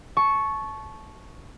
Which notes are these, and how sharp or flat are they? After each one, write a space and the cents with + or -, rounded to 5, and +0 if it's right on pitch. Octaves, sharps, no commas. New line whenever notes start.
A5 -20 C#6 +0